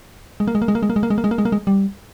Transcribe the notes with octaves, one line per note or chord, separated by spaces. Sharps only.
G#3
A#3
G#3
A#3
G#3
A#3
G#3
A#3
G#3
A#3
G#3
A#3
G#3
A#3
G#3
A#3
G#3
G3